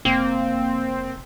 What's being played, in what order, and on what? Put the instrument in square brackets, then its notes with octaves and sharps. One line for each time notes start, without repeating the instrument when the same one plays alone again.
[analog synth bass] F1 [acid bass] A#3 [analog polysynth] C4